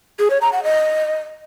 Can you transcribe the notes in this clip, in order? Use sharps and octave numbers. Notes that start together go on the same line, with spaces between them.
G#4
C#5
A#5
F#5
D#5